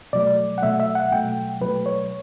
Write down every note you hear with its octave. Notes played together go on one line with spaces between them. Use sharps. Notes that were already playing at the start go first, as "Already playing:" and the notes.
B2 F#3 A3 D5
F#5
B2 F#3 A3 E5
E5
F#5
B2 F#3 A3 G5
B2 F#3 A3 B4
C#5